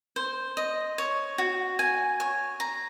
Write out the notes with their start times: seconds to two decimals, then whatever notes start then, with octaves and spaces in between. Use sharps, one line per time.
0.16 C5
0.57 D#5
0.98 C#5
1.38 F#4
1.79 G#5
2.20 C#5
2.60 A#5